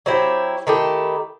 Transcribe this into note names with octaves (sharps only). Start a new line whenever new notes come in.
F#3 C4 E4 G4
D#3 A3 E4 G4